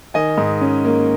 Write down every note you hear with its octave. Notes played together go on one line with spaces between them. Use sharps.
D#3 D#5 G#5
G#2
C#4
A#3